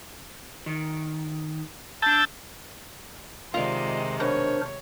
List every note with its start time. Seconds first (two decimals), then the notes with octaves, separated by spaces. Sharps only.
0.66 D#3
2.02 D4 A5 E6 G6 A6
3.54 C3 D#3 G#3 F4 C5 D5
4.20 B2 D4 A#4 C5 C#5